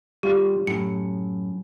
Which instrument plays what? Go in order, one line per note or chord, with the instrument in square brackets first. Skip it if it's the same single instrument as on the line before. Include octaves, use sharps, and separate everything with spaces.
[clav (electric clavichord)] G3 F4 F5 [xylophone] G4
[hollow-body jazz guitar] F#2 [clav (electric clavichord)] A2 [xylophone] C#7